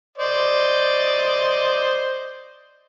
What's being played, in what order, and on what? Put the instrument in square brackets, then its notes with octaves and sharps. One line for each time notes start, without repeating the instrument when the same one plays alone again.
[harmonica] C5 D5 D#5